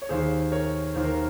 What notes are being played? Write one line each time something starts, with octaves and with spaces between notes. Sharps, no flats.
C#5
D#2 D#3 G#4 C5
A#4 C#5
D#2 D#3 C5
A#4